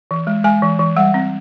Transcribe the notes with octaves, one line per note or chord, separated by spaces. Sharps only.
E3
G#3
G#3 G#5
E3
E3
G3 F#5
C4